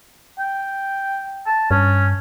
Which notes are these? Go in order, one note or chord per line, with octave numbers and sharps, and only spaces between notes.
G5
A5
G2 C#4